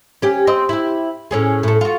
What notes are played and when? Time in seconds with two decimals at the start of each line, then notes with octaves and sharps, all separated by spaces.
0.22 C#4 G4
0.47 C4 D#5
0.69 E4 G4
1.31 A2 C#4 G#4
1.63 A2 A4
1.81 F4 F#4